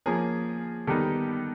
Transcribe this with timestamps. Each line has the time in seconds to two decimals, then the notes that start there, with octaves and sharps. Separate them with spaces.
0.06 F3 A#3 C#4 G#4 A#4
0.87 D#3 G3 B3 D#4 G4 A4